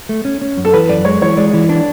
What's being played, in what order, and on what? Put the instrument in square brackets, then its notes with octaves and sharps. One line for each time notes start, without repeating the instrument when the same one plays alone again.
[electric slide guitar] A3
C#4
C#4
F#2
[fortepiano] A4
[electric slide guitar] E3 [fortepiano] B4
[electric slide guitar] F#2 [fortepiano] D5
[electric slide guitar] G#3 [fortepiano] C#5
[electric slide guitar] E3 [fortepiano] C#5
[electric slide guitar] G#3 [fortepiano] D5
[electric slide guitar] E3 [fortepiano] D5
[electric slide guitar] D4 [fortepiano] D5